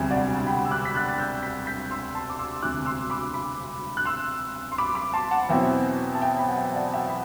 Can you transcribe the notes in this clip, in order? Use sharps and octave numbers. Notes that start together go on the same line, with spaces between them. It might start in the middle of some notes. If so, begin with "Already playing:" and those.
Already playing: E1 D2 C3 G3
D5 F#5
G5 B5
E6
D6 F#6
B6
F#6 A6
A6
E6 G6
G6 B6
G6 B6
C6 E6
A5 C6
D6
C6 E6
E1 D2 C3 D6 F#6
C6 E6
B5 D6
B5 D6
F#6
C6 E6
C6
B5 D6
B5 D6
A5 C6
F#5 A5
E2 B2 F#3 C4 E4 E5 G5
A5
E5 G5
G5 B5
F#5
E5 G5
D5 F#5
E5 G5
B5